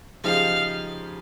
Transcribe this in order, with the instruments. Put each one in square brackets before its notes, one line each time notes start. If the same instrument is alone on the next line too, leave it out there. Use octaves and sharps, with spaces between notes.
[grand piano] C#3 F3 G#3 D#4 G4 [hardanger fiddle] F5